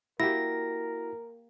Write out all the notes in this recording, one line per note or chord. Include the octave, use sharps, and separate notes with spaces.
A#3 E4 F#4 G4 A#4 A#6